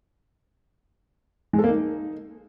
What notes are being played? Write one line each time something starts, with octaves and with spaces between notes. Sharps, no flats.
G#3
A4
A#3
D#4